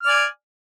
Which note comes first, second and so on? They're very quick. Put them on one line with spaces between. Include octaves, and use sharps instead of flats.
F6 D5 G#5